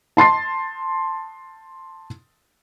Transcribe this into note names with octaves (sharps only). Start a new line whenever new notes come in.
A5 C6 A6 C7